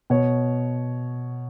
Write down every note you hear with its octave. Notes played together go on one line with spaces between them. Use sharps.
B2 C#5